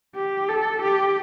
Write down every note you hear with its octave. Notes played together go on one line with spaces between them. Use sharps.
G4
A4
G4